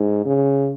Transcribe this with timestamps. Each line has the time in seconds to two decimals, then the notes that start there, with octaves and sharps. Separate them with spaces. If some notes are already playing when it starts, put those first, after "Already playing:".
Already playing: G#2
0.26 C#3